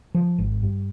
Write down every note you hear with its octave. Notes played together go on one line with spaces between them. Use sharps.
F3
G#1
G2